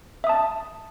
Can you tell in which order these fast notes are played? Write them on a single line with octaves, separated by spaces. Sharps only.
E5 D#6 A5